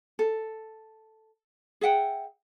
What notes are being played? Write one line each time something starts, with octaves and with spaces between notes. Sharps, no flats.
A4
G#4 E5 F#5 G5